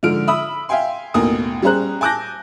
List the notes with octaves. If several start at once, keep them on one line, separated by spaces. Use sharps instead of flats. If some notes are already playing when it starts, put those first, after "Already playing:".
G#2 D3 F3 F6 D7
E5 B5 D#6 E6
E5 F5 G5 G#5 C6
A1 D#2 B2 A#4 G#5 D#6
G3 C#4 G#4 C5 A#5 F#6
G#5 A5 D6 F#6 G6 A#6